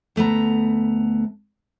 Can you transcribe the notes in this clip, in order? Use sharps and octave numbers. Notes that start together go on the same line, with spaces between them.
D2 A3 B3 A#5